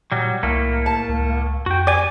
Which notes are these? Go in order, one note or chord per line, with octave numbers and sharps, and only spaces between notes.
A#2 F#3 G3
C2 A2 A3 A#3
A5
C#2
F2 F#4 G5
G4 D5 G#5